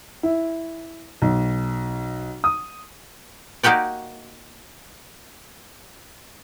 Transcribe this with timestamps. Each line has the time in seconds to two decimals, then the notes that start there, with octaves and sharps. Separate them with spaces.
0.23 E4
1.22 B1
2.44 D#6
3.63 A#3 D#4 F#4 G4 D5